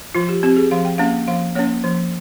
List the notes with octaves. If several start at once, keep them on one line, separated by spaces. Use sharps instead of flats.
F3 F4
G4
C4 G4
G#4
F3 F5
G5
A#3 C#4 F5
F3 F5
A#3 C#4 C#5
F3